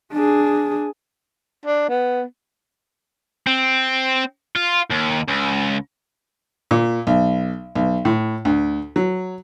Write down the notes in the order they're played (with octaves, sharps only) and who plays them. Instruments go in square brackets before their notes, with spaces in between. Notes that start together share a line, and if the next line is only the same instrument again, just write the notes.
[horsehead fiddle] D4 G#4
[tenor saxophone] D4
B3
[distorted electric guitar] C4
F4
D#2
C#2
[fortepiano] A#2
B1
B1
A2
D2
F#3